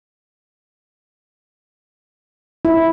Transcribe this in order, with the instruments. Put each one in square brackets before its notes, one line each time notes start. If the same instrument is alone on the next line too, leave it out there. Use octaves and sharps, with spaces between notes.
[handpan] E4